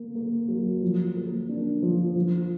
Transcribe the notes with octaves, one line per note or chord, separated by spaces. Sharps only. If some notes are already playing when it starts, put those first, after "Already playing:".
Already playing: A#3
A#3
F#3
F3
A#3
D4
F3
F3